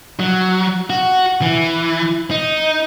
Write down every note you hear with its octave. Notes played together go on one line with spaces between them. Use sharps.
F#3
F#4
E3
D#4